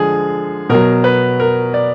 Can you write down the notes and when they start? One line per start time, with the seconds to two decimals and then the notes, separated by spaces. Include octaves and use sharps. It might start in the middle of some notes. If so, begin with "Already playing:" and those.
Already playing: D3 F3 G#3 G#4
0.70 B2 F#3 A#4
1.04 B4
1.40 A#4
1.74 D5